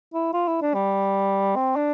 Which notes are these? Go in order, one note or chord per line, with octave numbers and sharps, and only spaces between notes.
E4
F4
E4
D4
G3
C4
D4